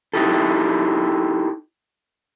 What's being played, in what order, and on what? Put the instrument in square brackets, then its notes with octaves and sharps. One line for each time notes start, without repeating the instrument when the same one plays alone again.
[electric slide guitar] D#4 E4 G4 A4